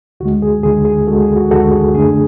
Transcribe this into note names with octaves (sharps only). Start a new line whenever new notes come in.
D2 D3 G#3 F#4
G#4
D2 D3 G#3 G#4
G#4
D2 D3 G#3 F#4 A4
G#4
F#4
D2 D3 G#3 F#4 A4
G#4
F#2 D3 A3 D4 G#4